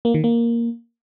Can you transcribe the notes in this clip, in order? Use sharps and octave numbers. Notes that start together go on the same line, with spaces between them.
A#3
D#3
A#3